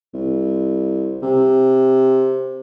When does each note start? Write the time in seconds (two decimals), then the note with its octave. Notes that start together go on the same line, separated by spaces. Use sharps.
0.14 C2
1.22 C3